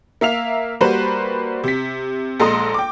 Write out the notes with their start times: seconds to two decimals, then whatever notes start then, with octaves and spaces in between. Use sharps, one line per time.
0.21 A#3 E5 F5 F7
0.81 G3 A#3 F#4 B4 C5
1.64 C3 B6
2.40 A#1 G#3 A4 A#5 C6 D#6
2.74 G5 D6